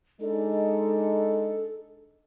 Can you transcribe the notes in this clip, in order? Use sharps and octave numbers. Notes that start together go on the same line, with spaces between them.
G#3 D4 D#4 A4